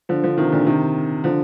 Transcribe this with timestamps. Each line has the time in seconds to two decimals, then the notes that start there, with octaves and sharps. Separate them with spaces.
0.09 D3 F3
0.24 D3 F3
0.38 C3 D#3
0.52 A#2 D3
0.67 C3 D#3
1.24 D3 F3